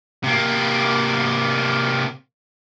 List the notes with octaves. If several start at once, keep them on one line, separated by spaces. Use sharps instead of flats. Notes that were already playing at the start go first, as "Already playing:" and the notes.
C3 A#3